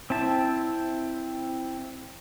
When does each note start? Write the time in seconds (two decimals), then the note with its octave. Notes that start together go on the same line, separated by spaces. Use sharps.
0.10 C4 E4 A5